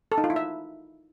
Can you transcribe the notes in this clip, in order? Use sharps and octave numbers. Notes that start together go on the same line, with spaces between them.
A4
D#4
F4
E4
E5